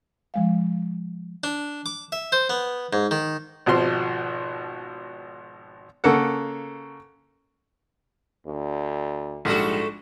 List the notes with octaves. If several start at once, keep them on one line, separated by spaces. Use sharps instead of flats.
F3 G#3 F5
D4
D6
E5
C5
B3
G#2
D#3
G#1 B2 F3 C6
C#3 A#3 A4 F#5
D2
A#1 G#2 G3 A3 F#4 A4